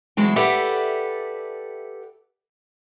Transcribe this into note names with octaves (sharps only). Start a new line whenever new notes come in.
E2 F#3 G#3 G5
G4 A4 B4 D5 E5 F#5